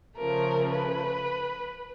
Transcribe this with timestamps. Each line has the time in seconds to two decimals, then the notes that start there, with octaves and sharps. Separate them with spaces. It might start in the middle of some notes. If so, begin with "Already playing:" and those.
0.18 C#3 F3 A3 A#4
0.72 B4